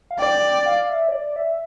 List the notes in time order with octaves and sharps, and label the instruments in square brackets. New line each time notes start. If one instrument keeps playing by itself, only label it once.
[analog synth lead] F5
[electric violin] D5 [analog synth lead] G5
[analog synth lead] G5
F5
E5
C#5
D5
E5